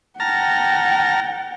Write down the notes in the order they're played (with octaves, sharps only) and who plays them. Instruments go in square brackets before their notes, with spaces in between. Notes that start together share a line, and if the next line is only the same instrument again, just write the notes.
[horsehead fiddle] F#5 G5 [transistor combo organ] A5 A#5 F6